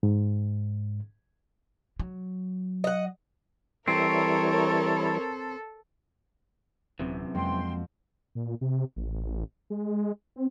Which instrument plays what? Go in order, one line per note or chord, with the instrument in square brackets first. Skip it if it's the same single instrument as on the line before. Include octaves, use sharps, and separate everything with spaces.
[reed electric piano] G#2
[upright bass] F#3
[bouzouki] D#5 F#5
[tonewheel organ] E3 G3 E4 [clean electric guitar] C4 [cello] A4 [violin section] A#4 C#5
[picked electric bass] D#1 C4 [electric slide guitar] F#2 C3 E3
[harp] F2 F#3 [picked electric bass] G#3 A#3 C4 [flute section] G5 C6
[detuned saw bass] A#2
C3
A1
G#3
C4